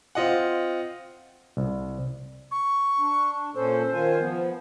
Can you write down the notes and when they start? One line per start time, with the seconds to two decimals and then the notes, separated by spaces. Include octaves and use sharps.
0.15 C4 F4 D#5 F#5
1.57 C2
2.51 C#6
2.99 D4
3.55 A#2 C#4 A4 C5
3.93 D#3 F4 G#5
4.20 F3 B3